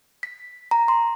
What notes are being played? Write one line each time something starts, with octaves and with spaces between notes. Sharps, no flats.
B6
A#5
C6